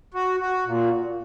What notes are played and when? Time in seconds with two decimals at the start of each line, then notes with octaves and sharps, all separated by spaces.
0.14 F#4
0.40 F#4
0.65 A#2